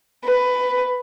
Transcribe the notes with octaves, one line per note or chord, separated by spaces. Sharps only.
B4